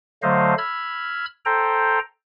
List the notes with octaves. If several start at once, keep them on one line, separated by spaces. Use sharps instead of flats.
D3 F#3 A3 C5 D#5 F5
B5 E6 F6 G#6
A4 C5 G5 A#5